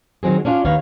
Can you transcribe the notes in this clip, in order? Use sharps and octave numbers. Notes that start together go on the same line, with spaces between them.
D#3 F#3 C4 G#4
C#4 D4 F4 C#5
D#2 D#3 A#3 B3 C#5 F5